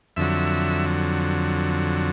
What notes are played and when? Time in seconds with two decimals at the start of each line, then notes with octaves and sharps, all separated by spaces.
0.17 F2 D3 F#3 E5